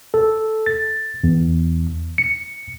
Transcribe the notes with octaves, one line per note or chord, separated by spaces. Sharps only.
A4
A6
E2
C#7